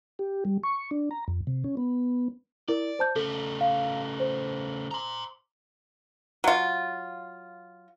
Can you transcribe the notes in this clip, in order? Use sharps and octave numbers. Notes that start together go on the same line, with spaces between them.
G4
G3
C#6
D4
A#5
F2
C3
C#4
B3
E4 A#4 D5
C5 A5 G6
C#3 A3 A4
F5
C5
A#5 C6
F#3 F4